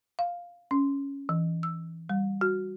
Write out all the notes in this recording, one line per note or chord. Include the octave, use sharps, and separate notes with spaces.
F5
C#4
E3
E6
G3
F#4